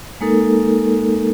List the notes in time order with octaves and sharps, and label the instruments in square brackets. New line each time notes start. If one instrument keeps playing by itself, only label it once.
[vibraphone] G#3 A#3 D#4 A4 A#4